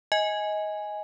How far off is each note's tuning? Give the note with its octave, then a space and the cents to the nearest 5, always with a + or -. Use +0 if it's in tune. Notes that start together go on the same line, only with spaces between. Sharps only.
D#5 +20 G#5 +0